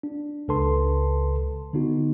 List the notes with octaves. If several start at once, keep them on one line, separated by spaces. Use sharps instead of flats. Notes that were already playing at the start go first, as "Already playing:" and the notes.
D4
C#2 C#3 A4 B4 A5 C6
D3 B3 D#4 F#4